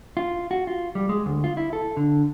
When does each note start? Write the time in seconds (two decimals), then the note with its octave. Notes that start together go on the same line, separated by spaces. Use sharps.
0.17 F4
0.51 F#4
0.67 F4
0.95 G3
1.09 G#3
1.26 D2
1.44 F4
1.57 E4
1.73 A4
1.97 D3